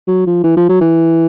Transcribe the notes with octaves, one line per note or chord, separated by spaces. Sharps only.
F#3
F3
E3
F3
F#3
E3